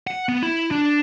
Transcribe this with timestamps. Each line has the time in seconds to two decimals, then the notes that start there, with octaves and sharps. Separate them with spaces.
0.07 F#5
0.29 B3
0.43 E4
0.71 D4